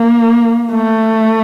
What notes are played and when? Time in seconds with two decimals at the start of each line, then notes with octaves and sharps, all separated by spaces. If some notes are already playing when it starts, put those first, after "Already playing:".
Already playing: A#3
0.71 A3